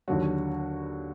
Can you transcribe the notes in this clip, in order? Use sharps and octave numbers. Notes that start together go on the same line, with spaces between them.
D#2 D3 F#3 F#4